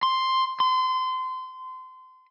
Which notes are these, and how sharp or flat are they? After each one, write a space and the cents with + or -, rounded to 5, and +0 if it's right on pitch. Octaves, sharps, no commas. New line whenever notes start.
C6 +0
C6 -25